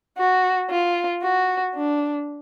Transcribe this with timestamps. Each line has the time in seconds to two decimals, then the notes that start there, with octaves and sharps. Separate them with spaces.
0.18 F#4
0.70 F4
1.23 F#4
1.75 D4